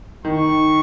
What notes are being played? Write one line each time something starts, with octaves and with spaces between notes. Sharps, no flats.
D#3 C#6